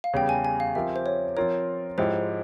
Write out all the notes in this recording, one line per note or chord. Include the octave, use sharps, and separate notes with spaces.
F5
E2 C#3 G3 C#4 G5
G#5
G#5
F5
F3 C4 G4 A#4 E5
C5
C#5
F3 C4 F4 A#4 C#5
G#2 F3 G#3 E4 G4 C5